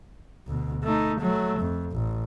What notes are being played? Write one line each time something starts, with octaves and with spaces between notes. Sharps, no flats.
D2 B2
A3 D#4
F#3 A3
F2
A1